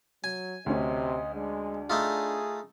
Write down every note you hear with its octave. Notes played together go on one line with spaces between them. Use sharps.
F#3 G#5
D2 C3 C#4 D#5
G#3 D4
A3 D#4 F4 G#4